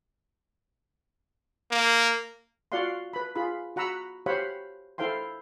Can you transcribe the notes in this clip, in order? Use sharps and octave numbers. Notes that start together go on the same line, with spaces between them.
A#3
F4 F#4 D5 F5 F#5 C6
B4 B5
F4 G#4 B5
F#4 F#5 A#5 B5 E6
G4 C5 C#5 F5 F#5 B5
E4 A4 C5 F5 G5 C6